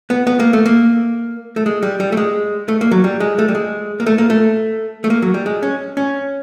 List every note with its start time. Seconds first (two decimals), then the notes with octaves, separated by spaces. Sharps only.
0.10 B3
0.27 B3
0.40 A#3
0.53 A3
0.66 A#3
1.56 A3
1.66 G#3
1.83 G3
2.00 G3
2.12 A3
2.17 G#3
2.68 A3
2.81 A#3
2.91 F#3
3.04 G3
3.20 G#3
3.39 A3
3.48 G3
3.55 G#3
4.00 A#3
4.06 A3
4.18 A#3
4.30 A3
5.04 A3
5.10 A#3
5.22 F#3
5.34 G3
5.46 G#3
5.63 C#4
5.97 C#4